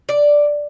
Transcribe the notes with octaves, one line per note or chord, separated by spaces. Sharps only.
D5